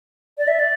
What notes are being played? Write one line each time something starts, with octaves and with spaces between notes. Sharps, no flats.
D5
E5
D5